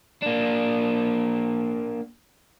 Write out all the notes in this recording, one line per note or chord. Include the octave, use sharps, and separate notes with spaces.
A#3 D4